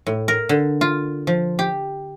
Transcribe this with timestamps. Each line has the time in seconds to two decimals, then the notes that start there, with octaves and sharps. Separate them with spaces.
0.07 A2
0.28 A#4
0.49 D3
0.81 F4
1.27 F3
1.59 G4